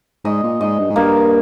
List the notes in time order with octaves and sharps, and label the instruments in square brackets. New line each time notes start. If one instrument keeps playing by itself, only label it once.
[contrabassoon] G#2 [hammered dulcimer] D#5
[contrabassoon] A#2
[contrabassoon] G#2 [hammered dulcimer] D#5
[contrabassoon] G2
G#2
[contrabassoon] G2 [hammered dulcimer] A#3